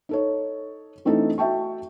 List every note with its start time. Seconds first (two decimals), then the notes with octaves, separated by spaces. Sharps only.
0.09 D#4 A4 C#5
1.05 E3 A3 C4 D4 D#4 A4
1.38 F#4 E5 G5 A5 C#6